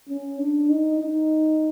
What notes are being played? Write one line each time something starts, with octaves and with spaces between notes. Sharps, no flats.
C#4
D4
D#4
D#4